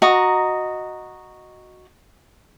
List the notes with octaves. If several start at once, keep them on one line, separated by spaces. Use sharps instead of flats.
F#4 D#5 A#5